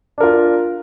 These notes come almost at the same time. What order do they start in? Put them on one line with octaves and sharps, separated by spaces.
D4 A#4 F4